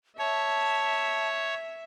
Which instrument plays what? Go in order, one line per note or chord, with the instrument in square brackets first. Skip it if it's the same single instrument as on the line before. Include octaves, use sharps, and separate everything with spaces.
[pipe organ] C#5 [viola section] E5 [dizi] A5